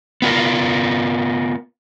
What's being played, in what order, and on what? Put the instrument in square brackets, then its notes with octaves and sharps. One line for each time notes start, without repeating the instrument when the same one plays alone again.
[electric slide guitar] B3 F4 A#4